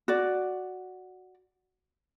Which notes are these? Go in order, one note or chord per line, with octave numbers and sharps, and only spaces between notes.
F#4 D5